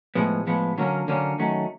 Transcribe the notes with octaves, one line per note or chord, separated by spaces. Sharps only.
A2 F3 G#3 B3
A2 F3 G#3 B3
D3 F#3 A#3 C#4
D3 F#3 A#3 C#4
D#3 F#3 A3 C#4